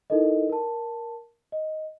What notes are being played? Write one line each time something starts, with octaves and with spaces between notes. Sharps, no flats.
D#4 E4 A4 A#4 D#5
A#4 A5
D#5